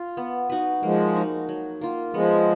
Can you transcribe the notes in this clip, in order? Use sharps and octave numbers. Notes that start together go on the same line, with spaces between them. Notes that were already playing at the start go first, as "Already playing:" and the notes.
Already playing: F4
B3
D#4 F#4 B4
F3 G#3 A#3
D#4 F#4 A#4
F#3
A#3 F4
F3 G#3 B3